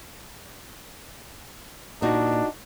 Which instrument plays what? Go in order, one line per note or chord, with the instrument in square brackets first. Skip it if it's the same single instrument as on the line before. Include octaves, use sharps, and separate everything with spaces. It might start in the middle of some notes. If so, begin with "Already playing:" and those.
[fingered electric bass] A#2 [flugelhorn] D4 [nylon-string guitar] D#4 F#4 D#5